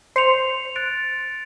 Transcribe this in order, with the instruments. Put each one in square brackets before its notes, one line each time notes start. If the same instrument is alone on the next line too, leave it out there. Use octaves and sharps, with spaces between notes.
[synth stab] C5 [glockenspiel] C6 C#7 F7
[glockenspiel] F#6 A6 D7